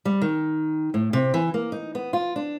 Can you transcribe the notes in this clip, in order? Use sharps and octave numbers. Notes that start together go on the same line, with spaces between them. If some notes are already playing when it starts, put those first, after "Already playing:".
G3
D#3
A2
C3
E3
A#3
D#4
B3
F4
D4